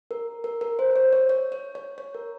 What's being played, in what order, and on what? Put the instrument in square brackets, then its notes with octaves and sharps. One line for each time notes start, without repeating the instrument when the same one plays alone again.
[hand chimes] A#4
A#4
A#4
C5
C5
C#5
C#5
C#5
C#5
C#5
C#5
A#4